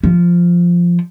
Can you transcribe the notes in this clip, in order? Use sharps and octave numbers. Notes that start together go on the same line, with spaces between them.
F3